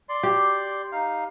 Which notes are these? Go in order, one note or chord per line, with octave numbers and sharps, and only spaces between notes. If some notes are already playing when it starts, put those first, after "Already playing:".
D5 C6
G4
D#4 F5